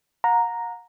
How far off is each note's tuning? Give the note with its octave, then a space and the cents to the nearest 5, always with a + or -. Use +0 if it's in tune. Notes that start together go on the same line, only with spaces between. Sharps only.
F#5 -40 A#5 +0